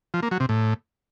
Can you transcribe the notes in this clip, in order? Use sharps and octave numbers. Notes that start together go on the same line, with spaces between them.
F3
A#3
F#3
C3
A2